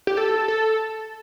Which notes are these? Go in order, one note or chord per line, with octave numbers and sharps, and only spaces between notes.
G4
A4
A4